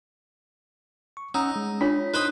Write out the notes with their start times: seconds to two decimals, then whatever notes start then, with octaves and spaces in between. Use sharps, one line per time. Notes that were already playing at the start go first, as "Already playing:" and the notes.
1.17 C#6
1.35 C#4 D#4 F#5 E6
1.56 G#3
1.81 D4 F4 C#5 B6
2.14 D#4 B4 C5 B5 D#6